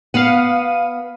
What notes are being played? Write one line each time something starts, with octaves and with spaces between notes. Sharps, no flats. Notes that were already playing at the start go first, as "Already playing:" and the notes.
B3 F5 F#5 D#7